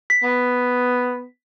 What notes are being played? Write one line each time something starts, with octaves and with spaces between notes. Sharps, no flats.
B6
B3